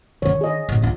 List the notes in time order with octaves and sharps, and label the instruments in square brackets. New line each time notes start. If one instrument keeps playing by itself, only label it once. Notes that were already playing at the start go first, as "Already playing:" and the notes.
[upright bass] D#3 D4 [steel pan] C#5
[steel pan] G#4 D#5
[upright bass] A1
D4 F4